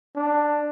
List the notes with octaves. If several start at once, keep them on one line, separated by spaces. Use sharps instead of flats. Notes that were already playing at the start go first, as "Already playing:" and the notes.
D4